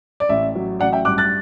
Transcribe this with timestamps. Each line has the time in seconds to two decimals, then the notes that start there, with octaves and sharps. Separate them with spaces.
0.20 D5
0.29 A1 E5
0.55 F#3
0.80 A1 D5 F#5
0.92 E5 G5
1.05 G2 D6 F#6
1.18 F#6 A6